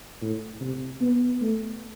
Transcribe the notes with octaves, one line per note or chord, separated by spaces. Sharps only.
A2
C3
B3
A3